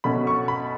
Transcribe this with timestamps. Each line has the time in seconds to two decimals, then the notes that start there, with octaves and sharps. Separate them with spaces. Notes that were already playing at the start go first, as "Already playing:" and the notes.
0.04 B2 A3 C#4 B5
0.27 C#6
0.48 B5